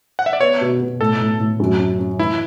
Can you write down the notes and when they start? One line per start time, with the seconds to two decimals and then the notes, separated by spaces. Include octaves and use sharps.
0.19 F#5
0.26 E5
0.33 D5
0.41 B3 C#5
0.61 B2
0.80 B2
1.00 A2 A4
1.20 A2
1.40 A2
1.60 F#2
1.79 C#4
1.99 C#4
2.19 E3 E4